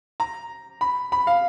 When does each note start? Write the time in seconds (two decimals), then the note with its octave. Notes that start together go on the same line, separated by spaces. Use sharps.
0.20 A#5
0.81 B5
1.12 B5
1.27 F5